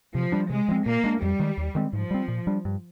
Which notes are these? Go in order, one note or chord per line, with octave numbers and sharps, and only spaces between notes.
C3 F3
G3 D4
C3 G#3
F3 C4
A#2 A#3
G#3 D4
F2 G3
D#3 G#3
D#2
D#3 G#3 C4
G#2 F3
G3 C4
A#2
G3 D4
G2